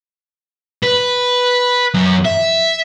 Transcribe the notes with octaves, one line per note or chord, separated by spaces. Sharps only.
B4
F#2
E5